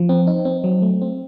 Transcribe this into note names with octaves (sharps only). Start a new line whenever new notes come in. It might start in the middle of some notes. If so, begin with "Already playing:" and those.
Already playing: F3
C4
D#4
C4
F#3
A3
C4